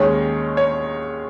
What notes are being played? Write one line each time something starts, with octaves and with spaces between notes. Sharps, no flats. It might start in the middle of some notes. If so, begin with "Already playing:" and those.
Already playing: D#2 D#3 G#3 C#4 C#5
C#5